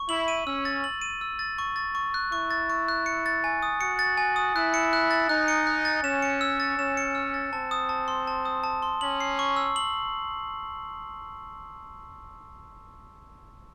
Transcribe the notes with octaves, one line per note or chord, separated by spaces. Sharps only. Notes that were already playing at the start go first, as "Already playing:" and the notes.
Already playing: C#6
E4 F#7
D#7
C#4 E6
A6
F#7
D#7
E6
A6
C#6
A6
C#6
F#6
E4 C#6
A6
C#6
F#6
C#7
A6
G#5
D#6
F#4 C#7
A6
G#5
D#6
E4 F#6
C#7
F#6
A6
D#4 F#6
C#7
F#6
A6
C#4 E7
C#7
E6
A6
C#4 E7
C#7
E6
A6
C4 A5
D#6
A5
C6
A5
D#6
A5
C6
C#4 F#7
C7
C#6
E6
F#7